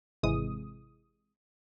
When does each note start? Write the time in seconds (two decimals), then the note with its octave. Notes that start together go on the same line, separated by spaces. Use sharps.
0.23 G#1 C3 E3 G#3 D#6